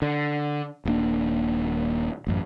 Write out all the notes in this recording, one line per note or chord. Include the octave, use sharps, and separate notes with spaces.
D3
D#1 G2 A#3 D4
A1 F#2